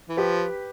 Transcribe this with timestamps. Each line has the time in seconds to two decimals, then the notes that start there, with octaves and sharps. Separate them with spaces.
0.09 E3
0.17 F3 G4 B4